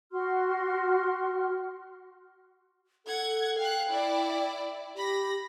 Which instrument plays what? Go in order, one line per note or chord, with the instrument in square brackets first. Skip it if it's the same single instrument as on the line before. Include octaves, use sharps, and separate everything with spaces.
[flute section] F#4 C6 F6
[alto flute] A4 [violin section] F#5 G#6
[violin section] F5 F#6 [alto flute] G5
[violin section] E4 D5
[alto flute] G4 [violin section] B5 A#6